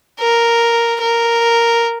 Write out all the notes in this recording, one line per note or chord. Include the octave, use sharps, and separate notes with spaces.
A#4
A#4